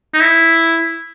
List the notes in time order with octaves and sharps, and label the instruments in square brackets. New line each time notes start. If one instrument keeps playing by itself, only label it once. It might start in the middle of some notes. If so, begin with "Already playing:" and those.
[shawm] D#4
E4